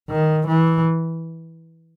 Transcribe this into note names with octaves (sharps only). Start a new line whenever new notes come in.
D#3
E3